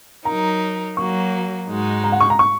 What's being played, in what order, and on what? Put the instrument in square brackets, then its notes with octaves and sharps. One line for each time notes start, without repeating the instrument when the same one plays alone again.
[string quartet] F#3 D#4 A#4 [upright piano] A#5
[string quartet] F#3 A#3 F#4 [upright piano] C#6
[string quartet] G#2 G#3 D#4 F#4
[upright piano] A#5
F#5
C#6
A#5
C#6